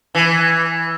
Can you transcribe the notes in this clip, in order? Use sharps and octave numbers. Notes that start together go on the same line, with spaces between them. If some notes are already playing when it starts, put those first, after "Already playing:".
E3